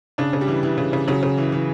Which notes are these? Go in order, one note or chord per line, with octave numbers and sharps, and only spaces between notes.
C#3 D4
C#3
G3
E3
E3
C#3
C#3
C#3 F#3
C#3
E3
E3